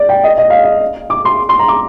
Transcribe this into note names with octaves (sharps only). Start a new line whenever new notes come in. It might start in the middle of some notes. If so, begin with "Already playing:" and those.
Already playing: D5
G5
D#5
D#5
F5
D#5
D6
C6
C6
A#5
D6